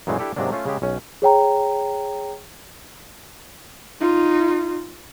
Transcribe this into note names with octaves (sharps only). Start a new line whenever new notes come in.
F#2 A#2 E3 G#3 A3
D4 E4 G4 A4 D5
G#2 C3 F#3 A#3 D4
A3 C#4 F4
C#3 G#3 G4
B1 C#4
G#4 C#5 G5 A#5
D#4 F4